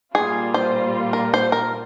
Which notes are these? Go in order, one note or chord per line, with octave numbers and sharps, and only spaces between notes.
A#2 G3 A#3 F4 G#4
C5
A#4
C5
A#4